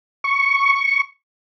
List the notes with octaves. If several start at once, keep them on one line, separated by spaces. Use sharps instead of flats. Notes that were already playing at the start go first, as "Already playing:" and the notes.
C#6